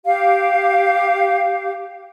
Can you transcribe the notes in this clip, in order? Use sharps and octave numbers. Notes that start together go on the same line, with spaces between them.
G4 F5